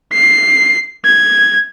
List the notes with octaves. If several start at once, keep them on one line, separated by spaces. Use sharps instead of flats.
C7
G#6